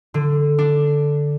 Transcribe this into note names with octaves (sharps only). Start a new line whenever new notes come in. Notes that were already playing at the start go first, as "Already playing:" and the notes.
D3
D4